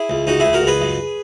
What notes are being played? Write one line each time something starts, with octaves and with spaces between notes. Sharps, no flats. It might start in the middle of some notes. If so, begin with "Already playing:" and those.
Already playing: E4 G#4
C#2
C#2 D#4 F#4
C#2 E4 G#4
F#4 A#4
C#2
G#4 B4
F#2